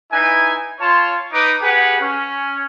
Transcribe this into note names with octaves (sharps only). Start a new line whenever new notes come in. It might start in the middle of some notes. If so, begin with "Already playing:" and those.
D#4 E4 B4 G#5
F4 C#5 A5 C6
D#4 B4 D6
G4 G#4 B4 F#5
C#4